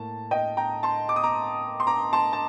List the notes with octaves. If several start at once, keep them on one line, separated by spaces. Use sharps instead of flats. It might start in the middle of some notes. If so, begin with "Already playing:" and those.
Already playing: A2 A#3 A5
D#5 G5
G5 A#5
A5 C6
D6
D#6
A#5 D6
C6
A#5 D6
A5 C6
A5